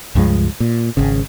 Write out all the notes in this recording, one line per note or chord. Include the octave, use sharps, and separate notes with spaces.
C#2 G2 F3 G#3
A#2
G#1 C#3